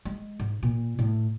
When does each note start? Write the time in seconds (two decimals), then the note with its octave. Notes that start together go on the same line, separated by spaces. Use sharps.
0.05 G#3
0.40 G#2
0.63 A#2
0.99 A2